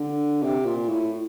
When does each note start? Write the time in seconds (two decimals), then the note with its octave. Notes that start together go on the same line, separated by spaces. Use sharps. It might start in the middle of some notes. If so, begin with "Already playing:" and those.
Already playing: D3
0.43 C3
0.64 A#2
0.88 A2